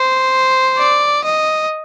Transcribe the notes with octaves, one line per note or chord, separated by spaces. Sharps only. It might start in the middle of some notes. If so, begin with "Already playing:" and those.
Already playing: C5
D5
D#5